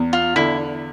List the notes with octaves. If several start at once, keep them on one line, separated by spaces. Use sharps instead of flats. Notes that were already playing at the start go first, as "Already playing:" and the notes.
Already playing: E2
F4
D3 E4